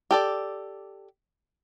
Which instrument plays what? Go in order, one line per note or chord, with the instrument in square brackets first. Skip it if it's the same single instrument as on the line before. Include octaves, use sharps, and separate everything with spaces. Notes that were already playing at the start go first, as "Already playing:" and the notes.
[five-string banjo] G4 A4 D5